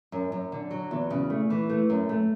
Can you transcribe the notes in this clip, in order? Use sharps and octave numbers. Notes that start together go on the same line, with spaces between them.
F#2
F#2
D3
F#3
E2
C#3
A3
E3
A3
F#2
A3